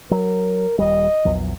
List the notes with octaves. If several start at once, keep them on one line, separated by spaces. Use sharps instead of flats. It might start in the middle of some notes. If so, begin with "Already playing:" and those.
F#3 A#4
D#1 G3 D#5
A#1 E2 F#3